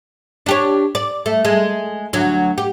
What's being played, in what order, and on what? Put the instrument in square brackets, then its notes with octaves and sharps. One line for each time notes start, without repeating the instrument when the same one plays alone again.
[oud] D4 G4 C#5
D5
A3
G#3
D2 F#3
G4